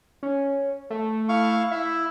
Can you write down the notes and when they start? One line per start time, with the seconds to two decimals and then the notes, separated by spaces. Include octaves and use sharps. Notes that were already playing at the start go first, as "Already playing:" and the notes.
0.23 C#4
0.90 A3
1.29 E4 F5 C#6
1.72 E4 E5